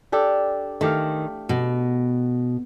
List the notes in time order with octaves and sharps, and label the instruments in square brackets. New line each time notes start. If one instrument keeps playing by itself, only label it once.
[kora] D4 G4 A4
[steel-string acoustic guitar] D#3 [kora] A3 G4 F5
[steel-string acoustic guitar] B2